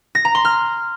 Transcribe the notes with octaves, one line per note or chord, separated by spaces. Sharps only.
A#6
A#5
C6
F6